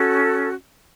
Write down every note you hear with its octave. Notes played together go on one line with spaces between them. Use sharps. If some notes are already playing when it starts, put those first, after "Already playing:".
Already playing: C#4 F#4 A4